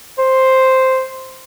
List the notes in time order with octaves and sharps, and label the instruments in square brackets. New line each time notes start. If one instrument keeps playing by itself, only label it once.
[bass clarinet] C5